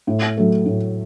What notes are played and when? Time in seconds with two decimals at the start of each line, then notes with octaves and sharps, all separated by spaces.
0.07 A2
0.37 F#3 A3
0.66 A2